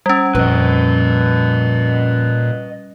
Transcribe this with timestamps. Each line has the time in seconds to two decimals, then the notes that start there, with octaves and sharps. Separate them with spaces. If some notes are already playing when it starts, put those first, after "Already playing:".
0.06 G3 C#4
0.35 F2 A#2 B4 D#5